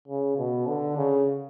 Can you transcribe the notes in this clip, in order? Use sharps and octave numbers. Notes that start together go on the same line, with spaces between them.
C#3
B2
D3
C#3